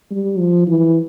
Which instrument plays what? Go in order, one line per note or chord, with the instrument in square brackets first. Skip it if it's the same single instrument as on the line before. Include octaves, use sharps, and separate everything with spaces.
[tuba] G3
F3
E3